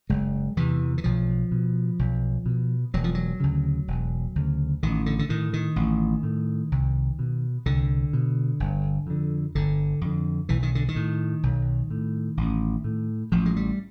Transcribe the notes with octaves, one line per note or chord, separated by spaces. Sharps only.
F#1 G#3
E2 C3 E3
E3
B1 F3
B2
B1
B2
E1 F#3
F3
F#3
D2 C#3
E1
D2 C#3
A1 D#3
D3
D3
A2 D#3
D#3
A1
A2
C2
B2
C2 D3
B2
G1
F2 D3
G1 D3
F2 D3
B1 E3
D#3
D3
D#3
A2
B1
A2
A1
A2
A1 F3
G#3
G3